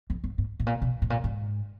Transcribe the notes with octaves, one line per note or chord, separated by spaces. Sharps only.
F2
G2
G#2
A2
A#2
B2
A2
A#2
G#2